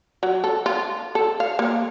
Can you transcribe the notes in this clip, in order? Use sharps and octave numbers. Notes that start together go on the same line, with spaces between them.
F#3
A4
F4
A4
F5
A#3